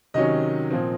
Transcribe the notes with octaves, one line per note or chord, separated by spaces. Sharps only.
C3 D#3 F#3 C#4 D#5
A#2 F3 C4